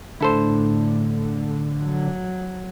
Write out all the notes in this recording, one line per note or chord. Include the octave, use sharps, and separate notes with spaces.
A2 D3 A3 E4 A4 C5
F#3